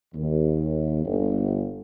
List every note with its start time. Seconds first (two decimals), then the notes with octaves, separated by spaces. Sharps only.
0.15 D#2
1.04 G1